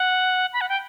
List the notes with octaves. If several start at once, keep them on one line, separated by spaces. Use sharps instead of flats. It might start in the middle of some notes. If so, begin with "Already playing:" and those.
Already playing: F#5
B5
F#5
G5